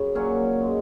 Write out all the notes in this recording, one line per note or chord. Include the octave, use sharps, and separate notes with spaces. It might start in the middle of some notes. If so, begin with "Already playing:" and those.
Already playing: F#2 C#3
A#2 F#3 A#3 C#4
G#3